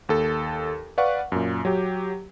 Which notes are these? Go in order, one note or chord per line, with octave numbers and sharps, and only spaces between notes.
D#2 A4
B4 D5 F5 F#5 C#6
F#2 A#2
F#3 G4